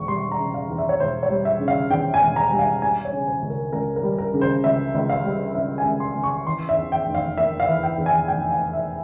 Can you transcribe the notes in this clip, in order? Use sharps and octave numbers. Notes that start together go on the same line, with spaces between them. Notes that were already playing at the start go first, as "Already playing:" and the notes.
Already playing: E1 C#6
G3 C6
A#5
C#3
F5
E2
E5
C#5
E1 C5
C#5
G3
E5
C#3
F5
E2 G5
G#5
E1
A#5
G3
F5
G3 G#5
C#5
C#3
C5
C#2
A#4
C#2 A#4
A#4
G3
A#4
C#3
C5
C#2 E5
C#2
F5
G3
C#3 E5
G#5
C#2
C6
C#2
C#6
E3 C6
E5
E2
G5
F1
F5
A#3 E5
F5
E3
G5
E2
G#5
F1 G5
F5
A#3
E5